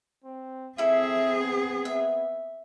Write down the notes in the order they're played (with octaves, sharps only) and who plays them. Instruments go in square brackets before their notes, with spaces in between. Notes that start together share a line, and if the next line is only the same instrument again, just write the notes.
[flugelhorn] C4
[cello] C4 G#4 [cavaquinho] E4 A4 [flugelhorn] E5
[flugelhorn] B3
[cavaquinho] E5